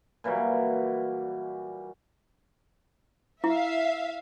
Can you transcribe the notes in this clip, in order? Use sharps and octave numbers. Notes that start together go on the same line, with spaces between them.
A#2 E3 F#3 G3
E4 E5 F5